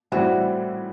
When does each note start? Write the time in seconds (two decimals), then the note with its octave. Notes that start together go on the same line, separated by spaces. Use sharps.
0.12 A2 E3 G3 C4 E4 F#4